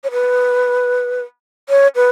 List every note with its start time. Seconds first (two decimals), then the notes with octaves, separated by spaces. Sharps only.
0.04 C#5
0.11 B4
1.69 C#5
1.96 B4